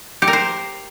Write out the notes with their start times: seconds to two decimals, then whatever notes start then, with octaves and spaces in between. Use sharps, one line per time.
0.22 G4
0.28 A#4
0.33 C5